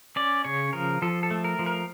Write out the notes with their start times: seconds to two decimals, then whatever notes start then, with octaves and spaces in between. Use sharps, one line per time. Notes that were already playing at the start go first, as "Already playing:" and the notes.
0.16 C#4 D5
0.45 C#3 C#5
0.73 F3 A#4
1.02 F3 A4
1.23 A4
1.31 A3
1.44 A#4
1.59 F3
1.66 A#4